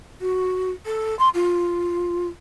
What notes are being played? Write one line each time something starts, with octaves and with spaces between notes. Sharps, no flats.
F#4
A4
C6
F4